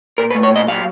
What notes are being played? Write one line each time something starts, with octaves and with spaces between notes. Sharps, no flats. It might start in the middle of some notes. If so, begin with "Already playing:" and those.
A#2 A#4
B4
A3
C#5
A#2 D#5
F#3 F5